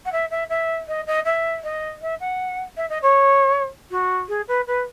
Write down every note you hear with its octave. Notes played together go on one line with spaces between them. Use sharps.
F#5
E5
E5
E5
D#5
D#5
E5
D#5
E5
F#5
E5
D#5
C#5
F#4
G#4
B4
B4